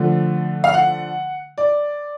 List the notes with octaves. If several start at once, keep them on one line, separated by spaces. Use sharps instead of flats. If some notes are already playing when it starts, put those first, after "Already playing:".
Already playing: D3 F3 A3
F5
F#5
D5